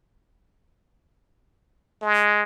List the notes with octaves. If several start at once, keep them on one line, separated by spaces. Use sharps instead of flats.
G#3